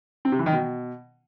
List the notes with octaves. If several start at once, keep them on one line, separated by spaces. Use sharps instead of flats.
C4
C3
E3
D#3
B2